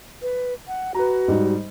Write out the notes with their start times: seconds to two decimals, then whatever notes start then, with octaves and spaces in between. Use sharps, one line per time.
0.22 B4
0.68 F#5
0.95 F#4 B4 A#5
1.28 G#2 G3 D#4